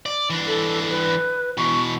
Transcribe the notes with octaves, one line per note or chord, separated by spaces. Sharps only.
D5
E3 D4
A4
B4
B2 E3 C#6